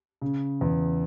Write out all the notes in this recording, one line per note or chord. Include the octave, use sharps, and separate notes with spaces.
C#3
E2